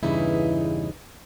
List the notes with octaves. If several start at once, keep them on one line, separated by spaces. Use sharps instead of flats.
E2 G2 C#3 E3 D#4 E4